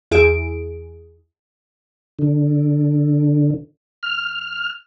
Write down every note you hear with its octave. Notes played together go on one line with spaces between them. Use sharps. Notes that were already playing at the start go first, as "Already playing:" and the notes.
E2 E4 G#4 D7
D3
F6